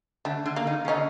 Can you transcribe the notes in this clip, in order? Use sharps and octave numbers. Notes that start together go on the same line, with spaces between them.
D3 A3
D3
A#3
D#3
C#3
D3 C#4 D#4